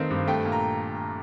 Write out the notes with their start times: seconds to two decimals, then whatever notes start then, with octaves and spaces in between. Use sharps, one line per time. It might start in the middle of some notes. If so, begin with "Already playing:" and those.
Already playing: D#3 A3 C4 F5
0.10 G2
0.27 A3 G5
0.45 A#2
0.52 A#5